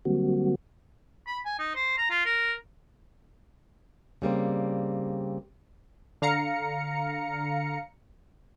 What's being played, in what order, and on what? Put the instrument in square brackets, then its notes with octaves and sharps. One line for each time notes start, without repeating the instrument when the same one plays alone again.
[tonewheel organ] D3 F#3 G3 A#3 C4 F#4
[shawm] B5
G#5
D#4
C5
A#5
F4
A#4
[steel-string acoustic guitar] C#3 G3 A#3 C4
[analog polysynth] D3 F5 A#5 C#7